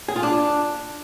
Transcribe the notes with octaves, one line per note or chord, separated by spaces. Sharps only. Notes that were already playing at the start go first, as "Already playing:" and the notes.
G#4
F4
D4